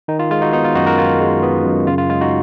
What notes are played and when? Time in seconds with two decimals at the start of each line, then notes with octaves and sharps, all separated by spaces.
0.08 D#3 D#4
0.19 F4
0.31 G#3 F4
0.42 D#4 F#4
0.53 B3 D#4
0.64 F4
0.75 F#2 D#4 F#4
0.87 F#4 A#4
0.98 D#3 F4
1.21 G#3
1.43 B3
1.65 F#2
1.87 C#3 F4
1.98 F4
2.09 G#3 F4
2.21 D#4 F#4